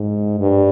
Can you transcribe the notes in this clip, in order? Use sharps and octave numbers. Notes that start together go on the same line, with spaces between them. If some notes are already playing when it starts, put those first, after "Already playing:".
Already playing: G#2
G2